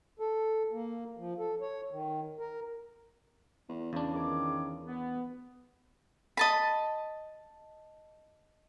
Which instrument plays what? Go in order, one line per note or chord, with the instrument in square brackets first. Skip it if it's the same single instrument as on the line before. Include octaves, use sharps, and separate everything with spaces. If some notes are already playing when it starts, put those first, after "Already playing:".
[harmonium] A4
A#3
F3
A4
C#5
D#3
A#4
[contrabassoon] E2
[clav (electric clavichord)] E2 D4 [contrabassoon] C#3
[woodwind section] D#3 G#4 D6
B3
[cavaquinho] D#5 A5 B5